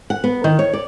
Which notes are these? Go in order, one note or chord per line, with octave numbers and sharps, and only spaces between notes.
F#5
B3
D#3
C#5
D5